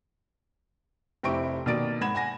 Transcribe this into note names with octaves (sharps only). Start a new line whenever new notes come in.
F1 C4 E4 G4 C#6 D7
B2 D#3 A#3 D5 A6 D7
G#2 F#5 B5 G#6 E7
F#5 G#5 A#6